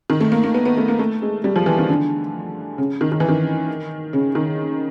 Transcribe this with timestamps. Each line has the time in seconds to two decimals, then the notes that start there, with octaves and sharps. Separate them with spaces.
0.10 D#3
0.20 A3
0.32 A#3
0.44 A#3
0.54 B3
0.65 B3
0.77 A3
0.88 A#3
0.99 A3
1.22 G#3
1.44 G3
1.56 F3
1.66 E3
1.78 D#3
1.89 D3
2.78 C#3
3.01 D#3
3.12 D#3
3.20 E3
3.29 D#3
4.13 C#3
4.35 D#3